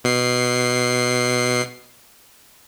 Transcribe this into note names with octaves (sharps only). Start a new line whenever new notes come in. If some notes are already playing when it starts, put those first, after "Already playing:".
B2 C7